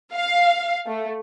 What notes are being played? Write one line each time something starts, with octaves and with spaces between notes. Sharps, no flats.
F5
A3